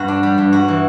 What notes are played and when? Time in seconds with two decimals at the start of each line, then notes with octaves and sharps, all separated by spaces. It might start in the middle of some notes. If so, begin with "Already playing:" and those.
Already playing: G2 F#4
0.08 D4
0.23 G3
0.38 G2
0.53 G2 F#4
0.68 E3